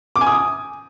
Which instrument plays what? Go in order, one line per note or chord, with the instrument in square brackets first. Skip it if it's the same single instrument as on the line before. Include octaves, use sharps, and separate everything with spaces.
[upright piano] D6
G#5
D#6